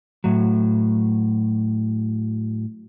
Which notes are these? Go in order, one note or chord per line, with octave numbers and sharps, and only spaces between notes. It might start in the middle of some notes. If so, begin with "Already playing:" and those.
A2 F#3